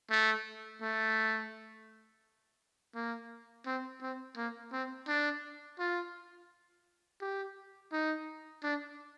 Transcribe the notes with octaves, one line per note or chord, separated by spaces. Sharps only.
A3
A3
A#3
C4
C4
A#3
C4
D4
F4
G4
D#4
D4